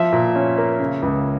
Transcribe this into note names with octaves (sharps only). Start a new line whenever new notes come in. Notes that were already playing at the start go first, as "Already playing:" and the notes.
Already playing: F3 E5
A#2
C#4
A#3
C#3
C#2